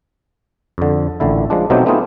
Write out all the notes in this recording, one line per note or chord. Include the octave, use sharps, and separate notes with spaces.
F2 D3
A1 A#2 D3 E4
F3 G#3 D4
B2 F#3 A3 C4 D#4 G4
A3 B3 C4 D#4 F4 G#4